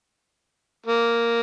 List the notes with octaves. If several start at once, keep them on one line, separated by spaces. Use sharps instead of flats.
A#3